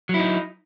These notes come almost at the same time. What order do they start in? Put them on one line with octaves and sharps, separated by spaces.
F#3 E4 D#4